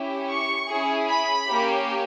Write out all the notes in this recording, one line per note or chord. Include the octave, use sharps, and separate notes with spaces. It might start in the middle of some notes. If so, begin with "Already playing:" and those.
Already playing: C#4 E4 G4
C#6
C#4 E4 G#4
B5
A#3 C#4 G4